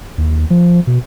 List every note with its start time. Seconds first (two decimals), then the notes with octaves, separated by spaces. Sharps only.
0.18 D#2
0.50 F3
0.87 B2